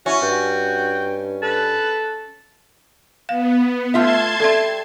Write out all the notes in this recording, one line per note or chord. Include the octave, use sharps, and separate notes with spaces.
C#4 E4 F#4
G2 F#4 G5
A4 B4
B3 F5
A3 F4 E5 A5 C6 G#6
G3 C4 A4 E5